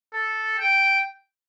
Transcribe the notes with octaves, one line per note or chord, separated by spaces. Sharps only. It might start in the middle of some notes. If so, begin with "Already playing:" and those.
A4
G5